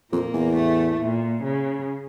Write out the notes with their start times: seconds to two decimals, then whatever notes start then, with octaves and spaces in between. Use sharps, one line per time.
0.12 F2 A#2 A#3
0.34 E2
0.55 A2 A3
1.00 A#2
1.43 C#3